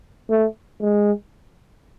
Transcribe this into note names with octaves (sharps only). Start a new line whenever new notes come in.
A3
G#3